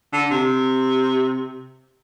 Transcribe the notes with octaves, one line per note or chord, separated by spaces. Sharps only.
D3
C3